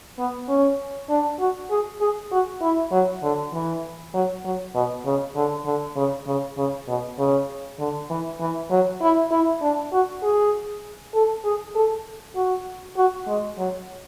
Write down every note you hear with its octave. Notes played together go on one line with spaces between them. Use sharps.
B3
C#4
D4
F#4
G#4
G#4
F#4
E4
F#3
D3
E3
F#3
F#3
B2
C#3
D3
D3
C#3
C#3
C#3
B2
C#3
D3
E3
E3
F#3
E4
E4
D4
F#4
G#4
A4
G#4
A4
F#4
F#4
G#3
F#3